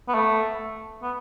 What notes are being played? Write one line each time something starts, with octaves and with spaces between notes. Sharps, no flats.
B3
A3
B3